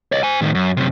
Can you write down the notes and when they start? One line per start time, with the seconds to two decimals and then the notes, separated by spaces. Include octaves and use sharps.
0.12 C#5 D#5
0.23 C5 G#5
0.41 A2 D#3
0.55 F#2
0.77 F#2 C3